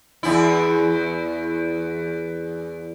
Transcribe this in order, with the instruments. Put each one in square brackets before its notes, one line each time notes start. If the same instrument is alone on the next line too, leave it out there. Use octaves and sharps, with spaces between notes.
[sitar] E2 E4